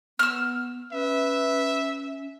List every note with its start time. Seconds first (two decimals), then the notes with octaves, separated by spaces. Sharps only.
0.19 B3 E6 F6
0.92 C#4 B4 E5